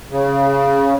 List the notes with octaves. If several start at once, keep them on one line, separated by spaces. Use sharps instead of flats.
C#3